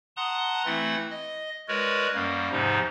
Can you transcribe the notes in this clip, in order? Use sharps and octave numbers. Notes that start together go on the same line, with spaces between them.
F#5 A5 A#5 C6 D#6 F#6
E3 A3 C4 E4 F#5 A6
D#5
G#3 F#4 A#4 B4 C#5 D5
F#2 G3 A#3
E2 G#2 C3 F3 D#4